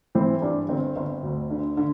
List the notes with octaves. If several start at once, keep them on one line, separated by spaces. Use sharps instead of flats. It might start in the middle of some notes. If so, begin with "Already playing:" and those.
E3 C4 E4
G2 D4
G1 C4
G1
D2
D3
D3